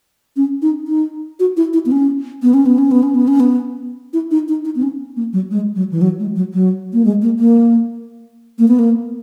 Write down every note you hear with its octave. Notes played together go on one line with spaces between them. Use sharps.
C#4
D#4
D#4
F#4
E4
E4
B3
C#4
B3
C#4
B3
C#4
B3
C#4
B3
C#4
B3
E4
D#4
D#4
D#4
B3
C#4
A#3
F#3
G#3
F#3
E3
F#3
G#3
F#3
F#3
A#3
G#3
A#3
A#3
A#3
B3
A#3